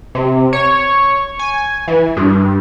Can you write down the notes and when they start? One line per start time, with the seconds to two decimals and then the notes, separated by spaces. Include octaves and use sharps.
0.15 C3
0.53 C#5
1.39 G#5
1.88 E3
2.17 G2